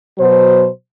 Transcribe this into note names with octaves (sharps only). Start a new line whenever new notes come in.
B2 F#3 C5